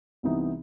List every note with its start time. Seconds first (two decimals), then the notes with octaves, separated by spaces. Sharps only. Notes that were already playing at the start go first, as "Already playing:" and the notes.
0.23 C2 C3 E3 B3 D#4